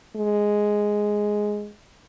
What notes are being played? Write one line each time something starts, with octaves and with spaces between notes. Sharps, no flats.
G#3